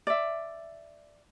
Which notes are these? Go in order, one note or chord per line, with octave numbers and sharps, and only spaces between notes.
D5 E5